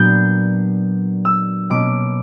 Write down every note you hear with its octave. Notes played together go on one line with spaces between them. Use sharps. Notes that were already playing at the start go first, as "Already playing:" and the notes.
Already playing: A#2 F#3 B3 D4 G6
E6
B2 A#3 C#4 D6